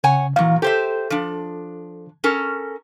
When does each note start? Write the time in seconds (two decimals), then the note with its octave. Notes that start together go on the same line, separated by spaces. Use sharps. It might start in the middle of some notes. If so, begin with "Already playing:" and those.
0.04 C#3 C#5 F#5 G#5
0.36 A#2 E3 F#3 F5
0.62 G4 A4 C5 E5
1.10 F3 D4
2.24 C#4 A4 A#4